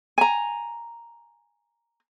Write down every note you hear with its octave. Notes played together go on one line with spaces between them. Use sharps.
G#5 A#5